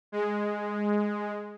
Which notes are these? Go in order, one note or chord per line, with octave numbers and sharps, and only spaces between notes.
G#3